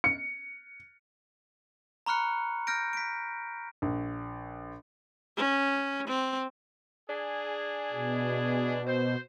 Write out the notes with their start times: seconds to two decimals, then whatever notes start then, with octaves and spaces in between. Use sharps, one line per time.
0.04 C#7
2.06 A#5 B5 C#6 F6 F#6 C#7
2.67 F6 G6 A#6 D7
2.93 B6 D7
3.82 A#1
5.37 C#4
6.08 C4
7.09 D4 G#4
7.92 B2
8.87 C5